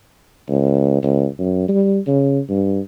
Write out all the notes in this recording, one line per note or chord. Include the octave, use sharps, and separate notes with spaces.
C#2
C#2
F#2
G3
C#3
G2